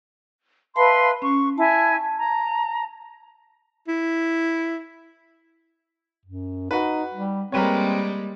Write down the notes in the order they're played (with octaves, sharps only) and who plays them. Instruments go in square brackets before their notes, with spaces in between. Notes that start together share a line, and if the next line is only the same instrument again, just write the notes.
[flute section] B4 E5 C6 [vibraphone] F5 A5 B5
[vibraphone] C#4 [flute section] C#6
[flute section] E4 G#5 [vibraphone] A5
[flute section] A#5
[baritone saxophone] E4
[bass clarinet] F#2
[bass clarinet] D#4 [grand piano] F#4 B4
[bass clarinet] G3
[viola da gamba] G3 G#3 A#3 [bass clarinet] C4 [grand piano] A#4 B4 C#5